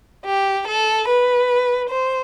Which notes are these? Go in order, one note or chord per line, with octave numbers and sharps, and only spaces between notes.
G4
A4
B4
C5